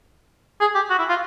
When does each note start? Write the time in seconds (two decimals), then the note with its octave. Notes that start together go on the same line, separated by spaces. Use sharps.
0.61 G#4
0.75 G4
0.90 F#4
0.99 E4
1.09 F4